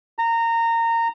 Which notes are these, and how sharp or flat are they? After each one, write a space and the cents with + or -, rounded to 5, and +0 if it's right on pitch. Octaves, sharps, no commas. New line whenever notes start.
A#5 -20